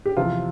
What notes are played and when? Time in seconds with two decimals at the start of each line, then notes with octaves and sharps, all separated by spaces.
0.06 G4
0.17 E2 C3 F3 F4